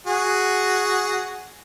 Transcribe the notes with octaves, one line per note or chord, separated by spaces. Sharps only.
F#4 G#4